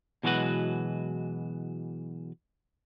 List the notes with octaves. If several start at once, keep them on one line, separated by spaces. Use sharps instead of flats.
B2 E3 F#3 G#3 F#4 B4